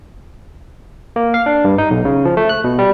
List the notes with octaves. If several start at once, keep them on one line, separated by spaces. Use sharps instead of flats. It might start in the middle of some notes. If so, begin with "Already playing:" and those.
A#3
F5
D4
G2
D#4
B1
C#3
F3
A3
F#6
B2
G3